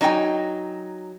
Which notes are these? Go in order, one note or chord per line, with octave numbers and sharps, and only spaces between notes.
F#3 D#4 A4 G5 G#5